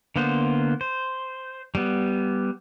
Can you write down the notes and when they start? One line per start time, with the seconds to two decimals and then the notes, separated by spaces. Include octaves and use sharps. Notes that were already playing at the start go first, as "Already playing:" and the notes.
0.16 D3 A#3 B3 C5
0.81 C5
1.75 G3 B3